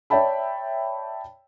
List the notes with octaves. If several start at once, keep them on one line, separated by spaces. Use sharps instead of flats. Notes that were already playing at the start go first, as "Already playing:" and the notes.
C#5 D5 E5 G5 A5 B5